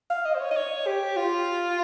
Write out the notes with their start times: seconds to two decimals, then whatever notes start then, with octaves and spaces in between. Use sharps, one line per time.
0.10 F5
0.25 D#5
0.35 C5
0.40 C#5
0.51 D#5
0.56 C#5
0.87 G4
1.17 F4